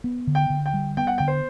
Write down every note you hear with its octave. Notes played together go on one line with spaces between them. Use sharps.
B3
D3
G5
D3
G5
G3
B3 G5
F#5
D3 G5
C5